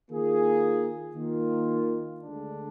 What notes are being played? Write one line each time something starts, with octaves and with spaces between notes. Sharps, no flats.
D#3 A#3 F4 G#4
D#3 A#3 F4
D2 D3 G#3 D4